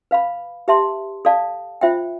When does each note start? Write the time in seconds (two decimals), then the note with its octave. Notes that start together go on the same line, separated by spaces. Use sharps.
0.11 B4 F5 B5
0.68 G4 B4 E5 A5 C6
1.25 A4 D5 F5 A5
1.81 F4 C5 E5 G5